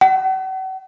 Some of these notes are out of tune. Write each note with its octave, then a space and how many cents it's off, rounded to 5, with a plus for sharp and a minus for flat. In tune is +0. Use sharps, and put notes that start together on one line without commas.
F#5 +40